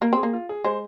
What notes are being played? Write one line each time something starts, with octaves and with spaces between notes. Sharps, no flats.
A#3 A#4
C4 G#4
A#3
F4
G#4
G#3 C5